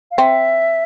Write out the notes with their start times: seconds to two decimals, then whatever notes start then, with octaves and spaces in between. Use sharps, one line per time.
0.11 F5
0.17 C4 E5